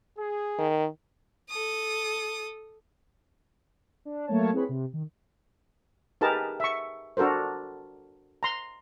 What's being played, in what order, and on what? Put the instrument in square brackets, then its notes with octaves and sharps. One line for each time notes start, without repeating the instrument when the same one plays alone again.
[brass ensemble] G#4
[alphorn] D#3
[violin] A4 D#6
[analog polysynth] D4
F#3 A3 A#3 C#5 A5
C4 E4 G#4 B4 C#5 B5
C3
D#3
[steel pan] D#4 G4 G#4 A#4 B4 A5
E5 C#6
D4 F#4 A4 A#4 C5
A#5 C6